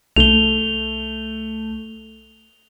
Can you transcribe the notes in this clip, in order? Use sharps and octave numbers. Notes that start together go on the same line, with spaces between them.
C2 A3 F7 G7